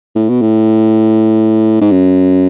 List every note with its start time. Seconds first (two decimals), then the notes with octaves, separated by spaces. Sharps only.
0.15 A2
0.29 B2
0.41 A2
1.81 G#2
1.91 F#2